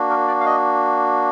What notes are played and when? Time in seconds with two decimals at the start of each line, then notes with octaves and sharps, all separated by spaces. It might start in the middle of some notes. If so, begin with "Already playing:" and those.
Already playing: A#3 D4 F#4
0.10 A#4
0.28 D5
0.40 F5
0.46 D#5